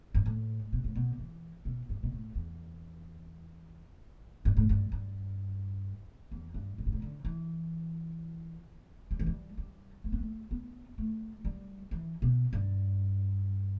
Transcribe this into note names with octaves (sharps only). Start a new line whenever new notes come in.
G2
A2
B2
A2
B2
E3
B2
G2
B2
A2
E2
G2
A2
G2
G2
E2
G2
A2
G2
A2
D3
E3
G3
E3
G3
G3
A3
B3
A3
B3
A3
G3
E3
B2
G2